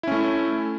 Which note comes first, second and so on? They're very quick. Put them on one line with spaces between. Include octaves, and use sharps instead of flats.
E4 C#4 A3